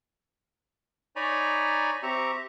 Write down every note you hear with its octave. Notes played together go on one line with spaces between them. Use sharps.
D#4 C#5 D5 G#5 A#5 B5
C4 G4 E5 A#5 C#6